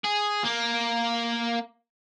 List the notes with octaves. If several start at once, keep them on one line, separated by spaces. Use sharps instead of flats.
G#4
A#3